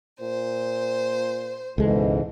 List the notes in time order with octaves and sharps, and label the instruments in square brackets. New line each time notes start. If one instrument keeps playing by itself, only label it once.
[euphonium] A#2 [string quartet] C5
[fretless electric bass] C#2 G#3 [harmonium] G#2 B2 E3 [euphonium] A4